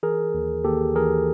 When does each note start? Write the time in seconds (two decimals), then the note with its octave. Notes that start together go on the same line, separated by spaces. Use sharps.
0.03 E3 G#4 A#4
0.34 D#2
0.64 D#2 G4 A4
0.96 E3 G#4 A#4